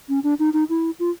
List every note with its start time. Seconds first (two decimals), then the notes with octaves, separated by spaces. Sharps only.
0.09 C#4
0.24 D4
0.39 D#4
0.53 D#4
0.69 E4
0.99 F4